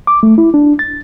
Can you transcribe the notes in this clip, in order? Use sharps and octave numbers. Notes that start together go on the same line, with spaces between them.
D6
A3
E4
D4
A6